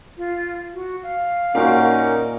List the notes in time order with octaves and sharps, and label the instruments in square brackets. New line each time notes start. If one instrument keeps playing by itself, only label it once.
[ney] F4
F#4
F5
[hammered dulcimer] A#2 F4 F#4 [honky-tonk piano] A#3 A#4 [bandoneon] C#4 D#4